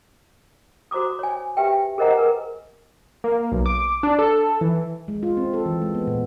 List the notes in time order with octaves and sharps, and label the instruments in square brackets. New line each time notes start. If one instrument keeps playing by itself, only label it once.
[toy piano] F#4 C5 A#5 D6 D#6
C#5 G#5
G4 B4 E5 G5
G#4 A#4 C5 D#5 F#5 A#5
G#4 A#4 B4 G#5
[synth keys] A#3
B1
D6
D4
A4
E3
[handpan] G#3
F4
C4
A4
E3
G#3
B3
A#2